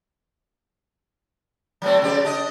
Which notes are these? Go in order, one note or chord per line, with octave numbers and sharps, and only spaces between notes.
F#3 A3 C4
C#3 G4 D5
D4 D#5